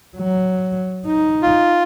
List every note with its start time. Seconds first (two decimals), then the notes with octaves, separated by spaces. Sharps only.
0.17 F#3
1.07 D#4
1.42 F4